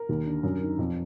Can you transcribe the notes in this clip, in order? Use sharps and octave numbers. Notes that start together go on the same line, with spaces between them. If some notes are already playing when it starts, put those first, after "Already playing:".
Already playing: A#4
D#2
D3
F#2
D#3
F2